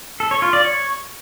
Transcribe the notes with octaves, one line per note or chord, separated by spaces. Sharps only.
A4
C#5
F4
D5
C#5